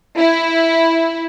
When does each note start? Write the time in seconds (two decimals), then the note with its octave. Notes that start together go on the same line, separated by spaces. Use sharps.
0.18 E4